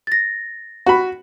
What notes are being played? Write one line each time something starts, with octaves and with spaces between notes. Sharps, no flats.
A6 A#6
F#4 B5